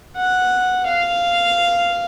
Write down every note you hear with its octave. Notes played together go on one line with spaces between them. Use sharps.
F#5
F5